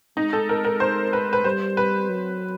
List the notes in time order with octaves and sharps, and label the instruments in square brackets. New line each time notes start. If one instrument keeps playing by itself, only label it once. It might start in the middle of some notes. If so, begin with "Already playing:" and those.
[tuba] G#3 [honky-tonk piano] D#4
[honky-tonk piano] A4
A#4
A#4
C5
B4
B4
[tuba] G3 [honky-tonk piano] C5
[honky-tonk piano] B4
[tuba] F#3